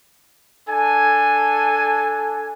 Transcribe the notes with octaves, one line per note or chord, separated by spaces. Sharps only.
D4 A4 G#5